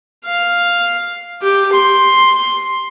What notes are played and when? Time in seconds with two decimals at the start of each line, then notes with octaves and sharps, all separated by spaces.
0.25 F5
1.41 G4
1.72 C6